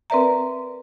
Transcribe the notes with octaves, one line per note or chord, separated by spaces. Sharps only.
C4 A#4 B4 D5 E5 A#5